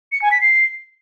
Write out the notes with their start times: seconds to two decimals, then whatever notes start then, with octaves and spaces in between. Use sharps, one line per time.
0.12 C#7
0.22 G#5
0.32 B6
0.41 C7